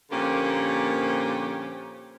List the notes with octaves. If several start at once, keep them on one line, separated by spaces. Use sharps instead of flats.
A#2 D3 F3 A#3 C#4 G4